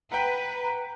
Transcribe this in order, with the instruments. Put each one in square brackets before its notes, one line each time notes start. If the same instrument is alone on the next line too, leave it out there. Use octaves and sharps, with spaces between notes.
[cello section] B4 [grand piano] F#5 G5 [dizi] A#5